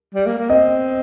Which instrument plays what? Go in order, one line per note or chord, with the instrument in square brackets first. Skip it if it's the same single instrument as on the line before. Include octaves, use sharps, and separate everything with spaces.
[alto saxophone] G3
A#3
A#3
[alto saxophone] C4 [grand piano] D#5